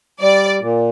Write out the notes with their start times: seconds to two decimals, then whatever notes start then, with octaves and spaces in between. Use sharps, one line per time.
0.21 G3 D5
0.61 A#2